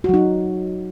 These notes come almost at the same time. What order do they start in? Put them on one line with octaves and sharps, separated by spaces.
F#4 F#3 D#4